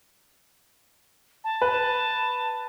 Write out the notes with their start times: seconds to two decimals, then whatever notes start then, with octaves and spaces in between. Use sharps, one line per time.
1.44 A5
1.62 B4